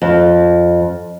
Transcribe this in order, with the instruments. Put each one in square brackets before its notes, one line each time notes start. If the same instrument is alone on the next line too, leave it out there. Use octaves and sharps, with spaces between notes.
[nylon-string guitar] F2